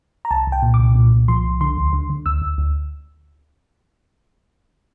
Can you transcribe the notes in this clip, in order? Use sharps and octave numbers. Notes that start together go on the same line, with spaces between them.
A#5
C2 A5
C2
G5
A#2
D6
C2
A#2
C2
F3 C6
C2
D3 C6
D2
D3
D3
D2 E6
D2
D2